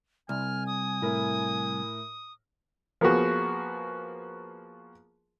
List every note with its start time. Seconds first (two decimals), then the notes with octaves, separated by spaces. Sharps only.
0.29 C2 G#5 F6
0.67 D#6
1.02 A2 E4 A#4
3.01 F3 A#3 B3 F#4 G#4